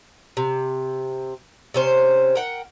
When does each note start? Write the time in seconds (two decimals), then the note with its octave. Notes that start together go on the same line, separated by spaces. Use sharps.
0.37 C3
1.74 C3 C#4 C5
2.35 A#4 F#5 G5